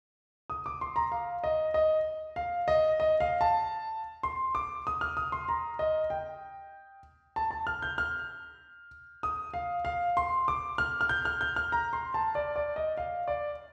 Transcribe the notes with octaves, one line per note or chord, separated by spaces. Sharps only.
D#6
D6
C6
A#5
F5
D#5
D#5
F5
D#5
D#5
F5
A5
C6
D6
D#6
F6
D#6
C6
A#5
D#5
G5
A5
A5
F6
G6
F6
D#6
F5
F5
C6
D6
F6
F6
G6
F6
G6
F6
A#5
C6
A5
D5
D5
D#5
F5
D5